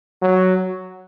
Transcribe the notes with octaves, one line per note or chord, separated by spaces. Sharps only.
F#3